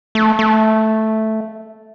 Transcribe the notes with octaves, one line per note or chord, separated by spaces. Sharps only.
A3
A3